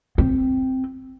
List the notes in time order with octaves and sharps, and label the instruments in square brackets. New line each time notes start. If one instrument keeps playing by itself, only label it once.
[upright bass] C4